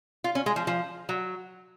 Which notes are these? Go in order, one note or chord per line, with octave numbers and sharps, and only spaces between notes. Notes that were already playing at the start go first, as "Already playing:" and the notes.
F4
C#4
G#3
F3
F3
F#3